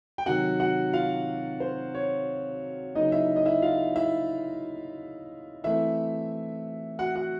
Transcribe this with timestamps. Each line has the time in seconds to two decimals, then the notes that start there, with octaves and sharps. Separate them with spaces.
0.18 G5
0.26 C3 D#3 F#3 F#4 F#5
0.60 F#4 F#5
0.93 F4 F5
1.60 C5
1.95 C#5
2.95 C#3 F#3 A#3 D#4 D#5
3.12 E4 E5
3.36 D#5
3.46 E4 E5
3.62 F4 F5
3.96 E4 E5
5.64 E3 A3 C4 E4 E5
6.99 F#4 F#5
7.16 F#4 F#5